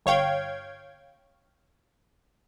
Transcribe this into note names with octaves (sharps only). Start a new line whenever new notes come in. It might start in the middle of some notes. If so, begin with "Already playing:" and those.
G1 C#5 F5 G5 G#6